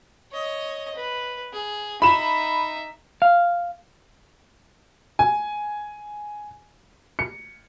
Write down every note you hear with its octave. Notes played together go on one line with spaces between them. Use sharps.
C#5 D#5
B4
G#4
D#4 E5 B5 E7
F5
G#5
C#7